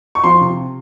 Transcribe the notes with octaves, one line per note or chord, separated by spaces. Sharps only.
C#6
F3 C6
C3